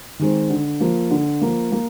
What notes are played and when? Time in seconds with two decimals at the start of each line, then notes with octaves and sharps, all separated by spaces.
0.19 D#3 G#3 C4
0.50 D3
0.80 F3 A#3
1.11 D3
1.41 F3 A#3
1.72 A#3